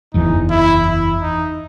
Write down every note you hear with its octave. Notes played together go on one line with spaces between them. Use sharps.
F#1 E2 C3 E3 D#4
E4
E4
D#4